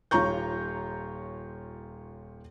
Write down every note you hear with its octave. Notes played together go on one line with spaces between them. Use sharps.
D#1 F4 C#5 A#5 C#6 G6